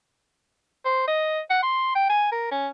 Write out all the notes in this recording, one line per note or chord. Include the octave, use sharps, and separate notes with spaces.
C5
D#5
F#5
C6
G5
G#5
A#4
C#4